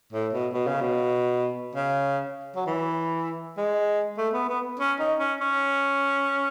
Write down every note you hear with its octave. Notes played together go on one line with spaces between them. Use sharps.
A2
B2
B2
C#3
B2
C#3
F#3
E3
G#3
A3
B3
B3
C#4
D#4
C#4
C#4